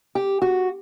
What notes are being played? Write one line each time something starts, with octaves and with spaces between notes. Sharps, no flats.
G4
F#4